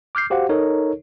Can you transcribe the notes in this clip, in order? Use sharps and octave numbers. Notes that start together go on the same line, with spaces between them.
D6 F6 G6 C7
F#4 G4 C5 F5 F#5
D#4 A4 A#4 C#5